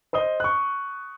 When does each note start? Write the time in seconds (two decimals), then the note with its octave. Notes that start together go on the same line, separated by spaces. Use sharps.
0.13 C5 D#5 D#6 G7
0.40 C#6 F#6